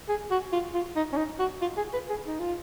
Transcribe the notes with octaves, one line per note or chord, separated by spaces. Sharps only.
G#4
F#4
F4
F4
D#4
C#4
D#4
F#4
F4
G#4
B4
G#4
D#4
F4